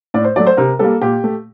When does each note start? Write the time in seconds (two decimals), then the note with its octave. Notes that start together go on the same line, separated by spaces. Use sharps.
0.14 A2 D5
0.24 C5
0.36 F#3 A3 D5
0.47 C5
0.57 C3 A#4
0.79 G3 A#3 A4
1.02 A#2 G4
1.24 A3